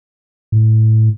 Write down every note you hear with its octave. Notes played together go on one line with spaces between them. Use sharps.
A2